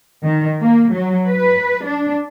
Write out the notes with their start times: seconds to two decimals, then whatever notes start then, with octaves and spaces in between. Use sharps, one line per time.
0.24 D#3
0.61 A#3
0.92 F#3
1.29 B4
1.86 D4